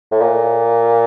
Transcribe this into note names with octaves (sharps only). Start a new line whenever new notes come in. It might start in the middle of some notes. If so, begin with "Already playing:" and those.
A2
A#2